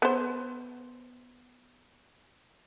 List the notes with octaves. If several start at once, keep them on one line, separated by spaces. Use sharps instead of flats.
B3 C5